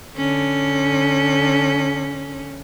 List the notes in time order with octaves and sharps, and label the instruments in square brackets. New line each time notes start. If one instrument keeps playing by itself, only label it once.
[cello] D3 C#4